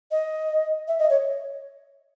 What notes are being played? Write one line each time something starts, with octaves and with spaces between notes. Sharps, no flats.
D#5
E5
D#5
C#5